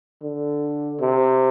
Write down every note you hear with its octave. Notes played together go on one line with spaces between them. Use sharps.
D3
C3